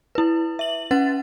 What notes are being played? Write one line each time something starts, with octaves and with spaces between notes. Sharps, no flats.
E4 B4
E5 F#7
C#4 B4 F#5 A6